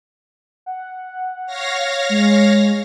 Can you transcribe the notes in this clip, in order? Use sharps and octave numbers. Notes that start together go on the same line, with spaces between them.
F#5
C#5 F5 A#6
G#3